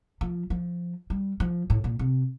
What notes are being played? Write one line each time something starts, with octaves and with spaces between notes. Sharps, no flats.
F3
F3
G3
F3
A2
A#2
C3